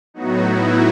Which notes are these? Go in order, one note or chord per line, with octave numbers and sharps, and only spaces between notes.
A2 F#3 B3 D#4 F#4
E4